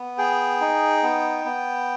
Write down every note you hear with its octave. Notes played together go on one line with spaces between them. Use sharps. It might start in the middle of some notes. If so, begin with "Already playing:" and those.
Already playing: B3
G#4 G5
D#4
B3
B3